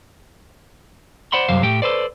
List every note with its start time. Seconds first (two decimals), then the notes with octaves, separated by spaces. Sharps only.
1.32 C5 D5 F#5 B5 C6
1.48 C2 F#2 F#3 G3 C5 F5
1.63 A2 G4 G5
1.82 A4 B4 C5 D5